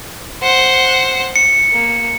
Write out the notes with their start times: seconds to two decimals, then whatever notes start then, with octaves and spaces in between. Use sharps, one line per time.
0.42 C5 F#5
1.36 C#7
1.72 A#3